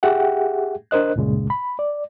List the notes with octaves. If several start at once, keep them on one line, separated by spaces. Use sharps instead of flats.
G4 G#4 E5 F#5 G5
D4 A#4 C5 D#5 F#6
C#2 G2 A#2 C#3 G#3
B5
D5